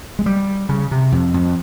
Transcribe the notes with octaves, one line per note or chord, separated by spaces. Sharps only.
G#3
G3
C#3
C3
F2
F2